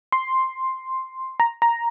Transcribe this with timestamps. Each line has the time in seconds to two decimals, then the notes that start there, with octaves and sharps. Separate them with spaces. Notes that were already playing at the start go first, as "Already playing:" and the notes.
0.12 C6
1.40 A#5
1.62 A#5